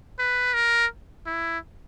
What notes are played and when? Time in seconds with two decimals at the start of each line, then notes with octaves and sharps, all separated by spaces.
0.19 B4
0.54 A#4
1.26 E4